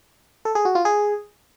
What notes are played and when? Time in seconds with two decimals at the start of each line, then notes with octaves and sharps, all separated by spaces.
0.45 A4
0.55 G#4
0.65 F#4
0.75 F4
0.85 G#4